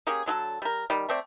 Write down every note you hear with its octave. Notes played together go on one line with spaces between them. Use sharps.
A#3 C#4 G4 G#4
D3 F#3 G#4 A4
G3 A#4
D#3 G3
A3 C4 D5